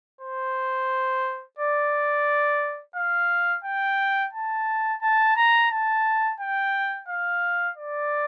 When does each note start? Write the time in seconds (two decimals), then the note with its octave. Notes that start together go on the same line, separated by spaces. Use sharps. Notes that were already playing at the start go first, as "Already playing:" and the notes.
0.21 C5
1.59 D5
2.96 F5
3.65 G5
4.33 A5
5.02 A5
5.36 A#5
5.71 A5
6.40 G5
7.08 F5
7.77 D5